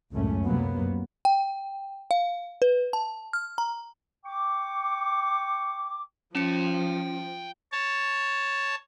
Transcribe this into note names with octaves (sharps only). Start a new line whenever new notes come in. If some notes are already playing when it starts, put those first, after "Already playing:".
C#2 F#2 A2 A3 C#4
F#2 C3 F#3 A#3 B3
G5
F5
B4
A5
F6
A#5
G5 C#6 D6
F3 C#4 G5 A5 C#7
C#5 A5